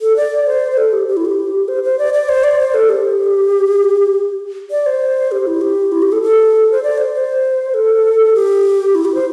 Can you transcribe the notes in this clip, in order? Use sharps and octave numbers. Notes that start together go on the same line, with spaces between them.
A4
D5
C5
C5
A4
G4
G4
E4
G4
C5
C5
D5
D5
C5
D5
C5
A4
G4
D5
C5
G4
E4
G4
E4
G4
A4
A4
C5
D5
C5
C5
A4
G4
E4
G4
C5